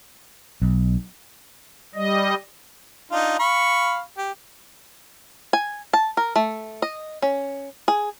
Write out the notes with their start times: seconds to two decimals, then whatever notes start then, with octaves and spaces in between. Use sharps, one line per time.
0.62 B1
1.95 G3 D#5
3.12 D4 D#4 F4
3.39 F5 B5 C#6
4.17 G4
5.53 G#5
5.93 A5
6.17 A#4
6.36 A3
6.82 D#5
7.22 C#4
7.88 G#4